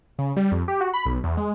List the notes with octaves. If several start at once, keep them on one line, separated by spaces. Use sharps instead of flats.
C#3
G3
F2
G4
F#4
B5
B1
E2
G#3